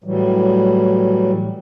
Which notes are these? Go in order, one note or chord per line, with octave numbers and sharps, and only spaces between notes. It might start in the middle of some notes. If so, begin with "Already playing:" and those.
A2 E3 F#3 G3